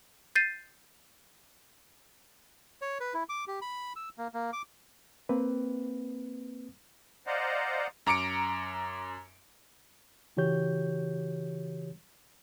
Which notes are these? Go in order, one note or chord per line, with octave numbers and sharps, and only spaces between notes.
G6 A6 C7 D#7
C#5
B4
E4
D6
G4
B5
E6
A#3
A#3
D6
A#3 C4 B4
C5 D5 D#5 F5 F#5 A#5
F#2 A#5 D6 C#7 D7
C#3 E3 F#4 G4 C#5 G6